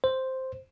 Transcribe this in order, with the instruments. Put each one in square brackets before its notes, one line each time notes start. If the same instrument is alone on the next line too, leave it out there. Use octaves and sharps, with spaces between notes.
[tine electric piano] C5